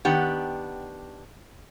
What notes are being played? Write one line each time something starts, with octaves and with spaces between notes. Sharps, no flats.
D#3 B3 D4 G4 F#5